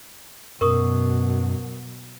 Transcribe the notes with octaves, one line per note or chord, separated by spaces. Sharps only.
F#2 B2 F#3 A#4 C#6 D#6